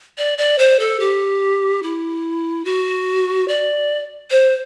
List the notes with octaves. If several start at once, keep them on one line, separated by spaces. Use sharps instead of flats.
D5
D5
C5
A4
G4
E4
F#4
D5
C5